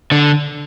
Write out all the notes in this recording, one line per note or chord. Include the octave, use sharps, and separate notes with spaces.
D3